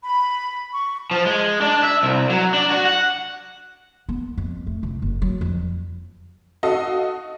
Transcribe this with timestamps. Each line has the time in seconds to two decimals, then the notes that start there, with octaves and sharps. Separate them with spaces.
0.03 B5
0.72 C#6
1.11 F3
1.26 G#3
1.61 D4
1.83 E5
2.03 C2
2.30 F#3
2.54 D4
2.70 F#4
2.86 F#5
4.09 B3
4.38 F2
4.67 A3
4.83 C2
5.02 F#1
5.22 F#3
5.41 F2
6.63 F#4 A4 D#5 F5